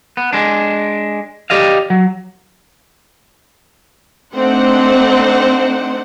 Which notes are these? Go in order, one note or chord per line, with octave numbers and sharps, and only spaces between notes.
B3
G#3 D4
G4 D5 D#5 F5
F#3
A3 C4 D4 D#4 C5 F#5